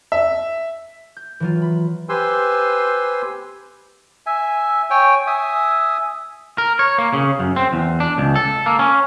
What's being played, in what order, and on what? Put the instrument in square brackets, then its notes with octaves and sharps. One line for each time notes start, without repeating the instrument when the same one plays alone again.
[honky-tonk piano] E5
[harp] G6
E3 F#3 F4
B5
[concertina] G4 B4 C5 G#5 C6 E6
[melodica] E5 G#5
C#5 G5 G#5
E5 G#5 D#6
[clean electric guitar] A#4
C#5
A#3
C#3
F#2
C4
E2
D4
C#2
A4
A#3
C#4